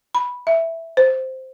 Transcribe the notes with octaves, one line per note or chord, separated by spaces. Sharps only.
B5
E5
C5